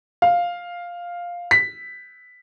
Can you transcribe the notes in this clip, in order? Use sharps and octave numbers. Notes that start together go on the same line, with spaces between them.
F5
B6